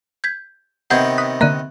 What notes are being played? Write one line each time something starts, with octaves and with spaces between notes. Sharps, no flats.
G6 G#6 B6
C3 D#3 B3 F#5 G6 G#6
D#6 F#6 B6
D3 A#3 E5 F#6 D#7